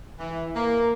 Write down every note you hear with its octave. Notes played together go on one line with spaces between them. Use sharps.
E3
A#3